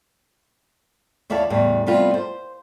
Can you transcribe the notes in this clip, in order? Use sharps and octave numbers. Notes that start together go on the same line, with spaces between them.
D#2 E4 C#5 D5 F5 A5
E2 A2 C#3 G3
C3 G3 A3 B3 F4
C5